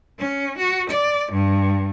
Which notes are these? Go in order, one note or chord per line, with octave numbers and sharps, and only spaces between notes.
C#4
F#4
D5
G2